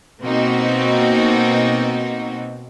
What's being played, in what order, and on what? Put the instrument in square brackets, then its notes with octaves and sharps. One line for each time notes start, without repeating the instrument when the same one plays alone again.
[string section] B2 A#3 C4 D#4 F#4